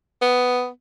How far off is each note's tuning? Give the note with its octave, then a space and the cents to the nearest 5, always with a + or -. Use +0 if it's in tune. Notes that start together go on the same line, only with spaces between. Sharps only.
B3 +10